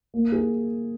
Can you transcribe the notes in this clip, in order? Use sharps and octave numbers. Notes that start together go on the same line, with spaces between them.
A#3
G#4